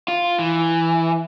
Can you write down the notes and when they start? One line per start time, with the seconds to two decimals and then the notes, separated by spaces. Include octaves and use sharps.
0.08 F4
0.39 E3